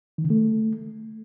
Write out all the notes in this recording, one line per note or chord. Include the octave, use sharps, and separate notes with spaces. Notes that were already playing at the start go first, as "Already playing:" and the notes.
D#3
C#3
A3